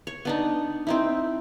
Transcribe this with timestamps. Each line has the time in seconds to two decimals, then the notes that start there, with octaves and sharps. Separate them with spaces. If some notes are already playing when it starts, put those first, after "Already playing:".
0.07 C#5
0.25 B3 D4 D#4
0.87 C4 D#4 E4